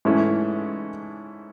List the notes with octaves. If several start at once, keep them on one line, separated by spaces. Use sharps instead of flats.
G#2 E3 A3 C#4 E4